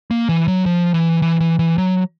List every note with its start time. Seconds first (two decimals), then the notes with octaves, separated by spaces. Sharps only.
0.11 A#3
0.29 E3
0.48 F#3
0.66 F3
0.94 E3
1.22 E3
1.40 E3
1.59 E3
1.78 F#3